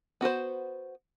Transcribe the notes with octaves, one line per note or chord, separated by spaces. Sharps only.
B3 F#4 B4 C5